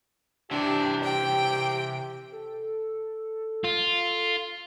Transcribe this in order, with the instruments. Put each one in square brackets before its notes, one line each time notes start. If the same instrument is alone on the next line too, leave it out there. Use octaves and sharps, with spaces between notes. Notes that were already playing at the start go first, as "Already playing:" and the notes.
[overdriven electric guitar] C3 E3 [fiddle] D4 [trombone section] G4
[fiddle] G5
[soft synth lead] A4
[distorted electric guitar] F4